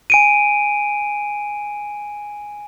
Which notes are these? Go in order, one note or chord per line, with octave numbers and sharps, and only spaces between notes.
G#5 D7 D#7